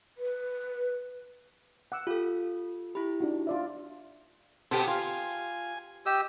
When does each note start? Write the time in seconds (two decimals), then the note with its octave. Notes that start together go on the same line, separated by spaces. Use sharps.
0.18 B4
1.92 F#5 D6 E6
2.07 F4 G4 A4 F5
2.95 E4 G4 B5
3.20 D4 D#4 F#4
3.47 F4 D5 E5
4.71 B2 B3 C4 G4 A4
4.87 F4 G#5
6.06 G4 D#5 E6